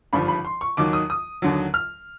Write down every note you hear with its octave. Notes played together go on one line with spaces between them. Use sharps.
G#1 G2 D3 F3 B5
B5
C6
C#6
D#2 D#3 F#3 D6
D#6
D#6
D#2 D3 F#3
F6